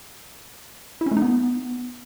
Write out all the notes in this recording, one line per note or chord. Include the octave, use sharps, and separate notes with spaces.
E4
C#4
A3
D#4
B3